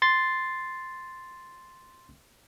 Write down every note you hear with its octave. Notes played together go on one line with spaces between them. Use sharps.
C6 A6 C7